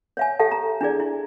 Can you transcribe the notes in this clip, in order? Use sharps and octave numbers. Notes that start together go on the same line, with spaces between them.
C#5 E5 G#5
G4 A4 E5 A5
A#5
D4 E4 G#4 D5
E4